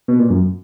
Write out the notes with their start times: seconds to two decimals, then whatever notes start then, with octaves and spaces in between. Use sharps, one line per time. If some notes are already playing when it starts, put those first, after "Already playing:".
0.08 B2
0.19 A#2
0.30 F#2